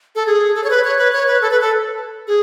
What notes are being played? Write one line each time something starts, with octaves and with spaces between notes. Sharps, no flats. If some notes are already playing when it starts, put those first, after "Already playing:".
A4
G#4
A4
C#5
B4
C#5
B4
C#5
B4
A4
B4
A4
G#4